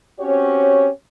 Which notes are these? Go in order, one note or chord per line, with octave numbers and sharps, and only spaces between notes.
C4 C#4 F#4 G4 C#5